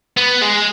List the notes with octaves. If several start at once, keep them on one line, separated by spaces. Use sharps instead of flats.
B3
G#3